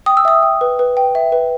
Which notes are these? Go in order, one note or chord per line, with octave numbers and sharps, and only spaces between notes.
G5 D#6
E6
E5 D#6
G5
B4
B4
G5
E5
B4